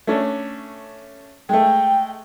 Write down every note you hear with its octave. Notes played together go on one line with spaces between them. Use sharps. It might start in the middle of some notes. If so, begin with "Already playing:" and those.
A3 C#4 D4
G#3 A3 G5